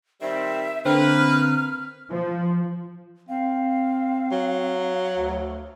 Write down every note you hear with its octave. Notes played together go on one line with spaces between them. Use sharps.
D#3 G3 C4 E5
D3 A#3 C4 B4 F6
F3
C4 F5
F#3
D2